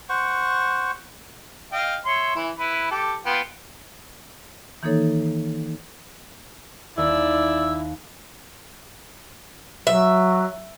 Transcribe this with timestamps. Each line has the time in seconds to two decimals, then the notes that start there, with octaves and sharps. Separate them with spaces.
0.09 C5 F#5 C#6
1.72 D#5 F5 G5
2.05 C#5 E5 C6
2.36 E3 E4
2.60 E4 B4
2.91 G4 A4
3.26 B3 F4 G5
4.83 D#3 E3 A#3 D#4 A4 C#5
6.97 D#2 E4 D5 E6
9.87 F#3 E5